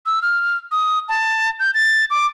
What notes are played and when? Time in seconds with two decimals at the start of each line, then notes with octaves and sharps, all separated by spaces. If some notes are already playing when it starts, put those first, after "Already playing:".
0.06 E6
0.22 F6
0.71 D#6
1.08 A5
1.60 G6
1.74 A6
2.10 D6